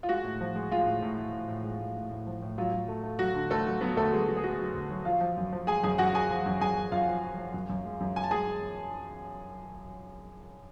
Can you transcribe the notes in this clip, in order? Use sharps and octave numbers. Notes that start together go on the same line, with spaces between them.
F4
G#3 F#4
A2
F3
G#3
G#3 F4
A2
A2
A2
A2
A2
G#3
A2
A2
A2
F3
A2
F#3 F4
F#3
A3
A3
F#3 F#4
D3
D2 A3 A4
F#3
F#3 B3 B4
D2 A3 A4
F#3 G#3 G#4
F#3 F#4
G#4
A3 F#4
F#3
D2
F#3
F3 F4 F5
F3
F#2
F3
G#3 G#4 G#5
F#2 G#4 G#5
F#2 F#4 F#5
F#2 G#4 G#5
F3
F#2
F#2 G#4 G#5
F#2
F#2 F4 F5
F3
F3
F3
F#2
F#2
G#3
F#2
F#2 G#5
A5
G#3 G#4 G#5